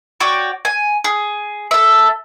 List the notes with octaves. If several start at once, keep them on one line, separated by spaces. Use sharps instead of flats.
F#4 C#5 D5 G5
G#5
G#4
A4 E5